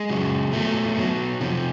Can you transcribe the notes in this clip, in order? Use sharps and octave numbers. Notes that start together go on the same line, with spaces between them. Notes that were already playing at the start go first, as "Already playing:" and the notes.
Already playing: G#3
C#3 F#3
B2 F#3 A3
B2 F#3
C3 F3